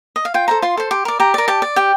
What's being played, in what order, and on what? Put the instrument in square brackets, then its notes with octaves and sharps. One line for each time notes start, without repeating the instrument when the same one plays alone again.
[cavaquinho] D#5
F5
F4 G5
A4 C5 A#5
F4 C6
A4 C5
G4
A#4 D5
G4 A#5
A#4 D5
G4 A5
D5
G4 G5